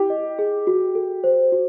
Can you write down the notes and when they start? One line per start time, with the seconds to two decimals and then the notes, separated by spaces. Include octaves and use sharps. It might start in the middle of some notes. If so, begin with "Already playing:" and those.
Already playing: E4 G4
0.10 D#5
0.39 G#4
0.67 F#4
0.95 A4
1.24 C5
1.52 F#4